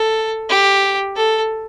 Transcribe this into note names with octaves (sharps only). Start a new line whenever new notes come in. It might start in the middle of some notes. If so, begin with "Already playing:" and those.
Already playing: A4
G4
A4